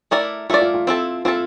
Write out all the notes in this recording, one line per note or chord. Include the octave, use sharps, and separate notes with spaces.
A3 E4 A#4 D5
A3 E4 F4 A#4 D5
F4
F4
C4 E4 A4
C4 E4 F4 A4